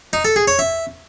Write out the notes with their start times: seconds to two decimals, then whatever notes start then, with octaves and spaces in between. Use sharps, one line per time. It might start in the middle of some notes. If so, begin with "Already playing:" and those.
0.13 D#4
0.25 A4
0.36 G#4
0.47 C#5
0.59 E5